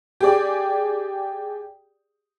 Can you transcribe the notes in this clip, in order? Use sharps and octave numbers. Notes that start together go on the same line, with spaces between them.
G4 G#4 D5